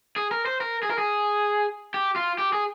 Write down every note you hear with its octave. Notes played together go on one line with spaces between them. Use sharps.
G#4
A#4
C5
A#4
G#4
A#4
G#4
G4
F4
G4
G#4